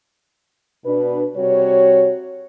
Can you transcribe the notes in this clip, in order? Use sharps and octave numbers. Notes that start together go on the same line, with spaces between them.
B2 D4 B4
C3 G3 F#4 C#5